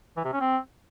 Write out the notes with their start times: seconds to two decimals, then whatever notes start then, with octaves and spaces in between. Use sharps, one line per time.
0.17 E3
0.25 C3
0.33 C#4
0.41 C4